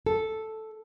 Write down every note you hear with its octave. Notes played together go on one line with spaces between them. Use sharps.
A4